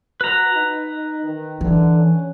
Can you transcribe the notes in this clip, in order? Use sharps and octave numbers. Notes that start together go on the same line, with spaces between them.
F#4 B4 A#5
D#4
D#3
D3 E3
C#4